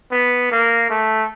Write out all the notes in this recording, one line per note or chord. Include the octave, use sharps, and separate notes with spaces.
B3
A#3
A3